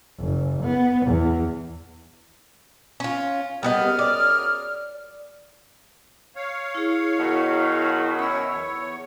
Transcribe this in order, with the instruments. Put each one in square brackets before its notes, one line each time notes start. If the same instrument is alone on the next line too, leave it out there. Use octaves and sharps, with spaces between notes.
[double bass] F#1
B3
E2
[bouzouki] C#4 F4
[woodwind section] F#2 G#4 F6 [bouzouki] G3 B3 D#5
[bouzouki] D5
[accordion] C#5 F5
[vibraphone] E4 G#4
[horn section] B2 D#3 F#3
[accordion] C#4 E4 C#5 [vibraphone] B5 E6
[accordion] E2 C#5